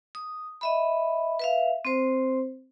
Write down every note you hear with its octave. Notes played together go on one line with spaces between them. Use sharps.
D#6
D#5 E5 B5
B4 E5 F5
C4 C5